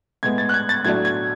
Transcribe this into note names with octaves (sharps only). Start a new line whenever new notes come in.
A2 G#3 B3 G#6
A6
F#6
G#6
A6
A2 F#3 A3 D4 G#6
G#6